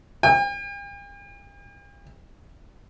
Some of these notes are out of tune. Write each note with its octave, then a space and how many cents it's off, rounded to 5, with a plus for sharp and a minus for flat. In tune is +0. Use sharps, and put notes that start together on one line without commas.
G5 +45